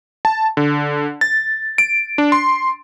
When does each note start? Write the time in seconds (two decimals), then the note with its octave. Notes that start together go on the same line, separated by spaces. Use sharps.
0.25 A5
0.57 D3
1.21 A6
1.78 D7
2.18 D4
2.32 C6